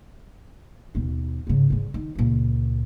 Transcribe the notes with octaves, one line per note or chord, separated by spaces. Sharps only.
D#2 B2
G#2 C#3
G#2 D3
D#3
C#2 A#2